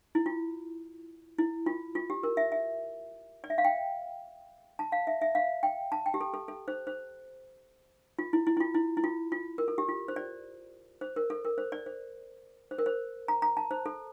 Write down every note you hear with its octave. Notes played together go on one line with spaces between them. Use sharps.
E4
F4
E4
F4
F4
G4
A#4
E5
E5
D5
E5
F5
G5
A5
F5
E5
E5
F5
G5
A5
G5
G4
A4
A4
A4
C5
C5
F4
E4
E4
E4
F4
E4
E4
F4
F4
A#4
A4
G4
F4
C5
D5
C5
A#4
A4
A#4
C5
D5
C5
C5
A#4
C5
A#5
A#5
A5
C5
A4